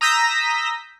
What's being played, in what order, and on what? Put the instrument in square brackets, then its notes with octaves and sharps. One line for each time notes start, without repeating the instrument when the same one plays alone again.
[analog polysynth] A#5 D#6 E6 G6 A#6 B6